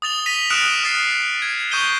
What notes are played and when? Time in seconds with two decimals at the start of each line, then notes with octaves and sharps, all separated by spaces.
0.02 D#6 A6 F7 G7
0.26 A#6 B6 D#7 F7 G7
0.50 D#6 F6 F#6 C#7 D7 E7
0.84 D#6 F6 A6 C7
1.42 G#6
1.71 C#6 D#6 G6 C7 D#7 G7